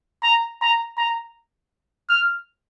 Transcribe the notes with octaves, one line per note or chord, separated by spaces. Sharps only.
A#5
A#5
A#5
F6